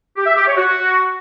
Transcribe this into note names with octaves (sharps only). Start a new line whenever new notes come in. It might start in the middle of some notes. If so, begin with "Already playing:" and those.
G4
E5
G4
C#5
F#4